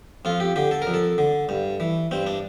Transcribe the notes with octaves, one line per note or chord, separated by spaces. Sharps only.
F2 F4
G4
D3 G4
A4
A#4
F2
A4
D3
G2
E3
G2 C4
D4